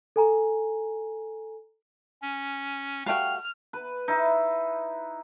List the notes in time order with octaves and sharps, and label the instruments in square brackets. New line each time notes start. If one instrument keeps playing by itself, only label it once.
[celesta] A4 G#5 A#5
[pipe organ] C#4
[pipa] G3 A3 F#4 [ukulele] F5 G5 [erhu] F6
[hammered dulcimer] B4
D#4 E4